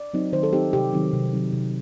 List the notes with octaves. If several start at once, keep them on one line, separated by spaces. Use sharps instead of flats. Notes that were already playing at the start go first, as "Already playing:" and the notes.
Already playing: D5
F#3 C4 D#4
D#3 C5
A4
F#3 C4 D#4 G4
C3 G4
D#3 F#3 C4 D#4
C3
D#3 F#3 C4 D#4
C3